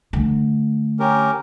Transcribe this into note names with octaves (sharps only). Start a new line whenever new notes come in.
D3 A3
C#4 G4 A#4